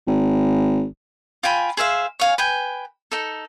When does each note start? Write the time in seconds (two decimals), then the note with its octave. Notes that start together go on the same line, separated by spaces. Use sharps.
0.07 G#1
1.43 F4 G5 G#5 B5
1.77 G#4 C5 E5 F5
2.20 C#5 F5 G#5
2.38 B4 G5 G#5
3.12 D#4 A4